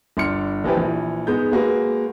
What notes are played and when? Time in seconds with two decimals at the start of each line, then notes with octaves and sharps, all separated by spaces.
0.17 G1 D4 C6 F6 C#7
0.64 A#1 E3 F3 G4 B4
0.77 A#1 E3
1.27 G#2 G#3 B3 G6
1.52 G#3 A#3 F#4 B4